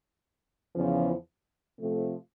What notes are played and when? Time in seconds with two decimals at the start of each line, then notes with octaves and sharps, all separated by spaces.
0.75 E2 C#3 F3
1.77 C3 F3 A3